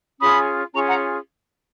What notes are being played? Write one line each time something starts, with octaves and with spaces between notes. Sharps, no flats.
C#4 F4 G#4 B5 D#6
C#4 F4 G#4 A#5 C#6
F#5 A#5